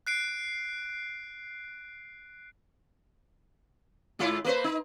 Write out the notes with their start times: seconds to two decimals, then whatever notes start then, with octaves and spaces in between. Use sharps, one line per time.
0.07 F#6 C7 D7
4.19 G#2 E4 F4
4.45 A#3 B4 C5
4.64 D#4